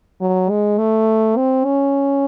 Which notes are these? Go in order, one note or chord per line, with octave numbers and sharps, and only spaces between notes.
F#3
G#3
A3
C4
C#4